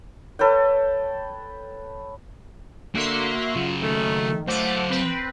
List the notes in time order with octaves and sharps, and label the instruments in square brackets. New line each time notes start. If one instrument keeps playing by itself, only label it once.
[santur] A4 B4 C#5 G5
[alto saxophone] D3 [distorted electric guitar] A#3 [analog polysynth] F#4 E5 C6
[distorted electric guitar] C#3 F#3 [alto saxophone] F4
[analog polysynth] D#3 [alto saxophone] A3
[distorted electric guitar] F#3 F5 [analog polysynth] A3 F#5 D6 [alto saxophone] C5
[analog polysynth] C4 B4